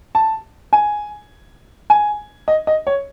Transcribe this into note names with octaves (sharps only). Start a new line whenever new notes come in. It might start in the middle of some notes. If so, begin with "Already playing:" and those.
A5
G#5
G#5
D#5
D#5
C#5